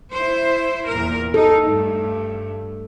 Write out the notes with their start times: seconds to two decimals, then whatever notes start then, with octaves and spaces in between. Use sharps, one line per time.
0.12 E4 C5
0.89 E2 A#2 A#4
1.34 D#4 A4
1.66 G2 A3